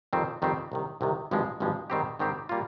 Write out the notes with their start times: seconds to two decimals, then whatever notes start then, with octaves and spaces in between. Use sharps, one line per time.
0.13 F2 D#3 G3 C4 G4
0.42 F2 D#3 G3 C4 G4
0.72 C2 C3 D#3
1.01 C2 C3 D#3
1.31 G#1 G2 F3 G#3
1.60 G#1 G2 F3 G#3
1.90 G#2 D#3 G3 C4 G4
2.19 G#2 D#3 G3 C4 G4
2.49 G3 A#3 F4